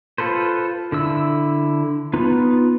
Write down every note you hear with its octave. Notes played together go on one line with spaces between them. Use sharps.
F4 A4 B4 C5
D3 E4 E6
B3 D#4 F4 B4